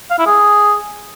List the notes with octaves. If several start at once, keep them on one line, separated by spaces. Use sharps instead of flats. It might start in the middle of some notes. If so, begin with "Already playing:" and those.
F5
E4
G#4